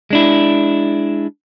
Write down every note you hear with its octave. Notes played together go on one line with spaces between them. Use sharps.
G#3 D4 E4